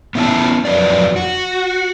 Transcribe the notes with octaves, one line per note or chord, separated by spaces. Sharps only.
B3 C#4 E4 F4 E5 A5
F2 F#3 B4 D5
F#4